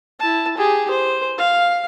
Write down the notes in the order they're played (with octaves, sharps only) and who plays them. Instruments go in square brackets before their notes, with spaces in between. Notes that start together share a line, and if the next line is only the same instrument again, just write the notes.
[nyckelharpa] E4 A5
G4 G#4
C5
F5